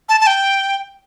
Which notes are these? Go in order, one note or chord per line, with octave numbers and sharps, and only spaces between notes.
A5
A5
G5